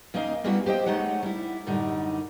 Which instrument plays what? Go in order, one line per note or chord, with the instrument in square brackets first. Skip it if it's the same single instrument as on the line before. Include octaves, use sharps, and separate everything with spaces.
[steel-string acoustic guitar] D#2 A#3 C#4 D#4 D#5 F5
G3 A#3 B3 C#4 E4 F#4
G4 C5 D#5 G5
G#3 A3 D#4 C#5 F#5
G3 E4
F#2 A2 D3 G3 D#4